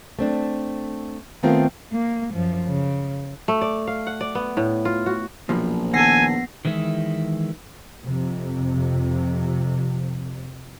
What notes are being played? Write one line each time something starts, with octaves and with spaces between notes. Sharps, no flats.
A3 C4 D4
D#3 A3 B3 C4 F4
A#3
F#2 F3
C#3
A3
D5
F5
F#5
D5
B3
A2
F4
F#4
A#1 F#2 B2 F3
D#3 B3 A4 G#5 A#6 C7
D#3 E3 G#3 E4
F2 C3